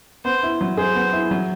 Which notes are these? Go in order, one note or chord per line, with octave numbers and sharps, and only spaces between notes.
B3 C5
E4
F#3
G#4 C5
B3
E4
F#3